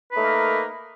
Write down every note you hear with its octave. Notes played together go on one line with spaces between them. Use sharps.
A3 A#3 D#4 A#4 B4